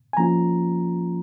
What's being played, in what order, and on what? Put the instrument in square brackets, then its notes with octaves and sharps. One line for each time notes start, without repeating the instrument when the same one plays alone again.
[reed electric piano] G#5
F3 A#3 C#4 F4 A#5